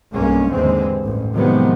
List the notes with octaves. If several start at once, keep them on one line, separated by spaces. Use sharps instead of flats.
B1 G2 G#3 A#3 C#4
D#2 G#2 D3 E3 G#3 C4
A1 G2
C3 D#3 F3 F#3 G#3 B3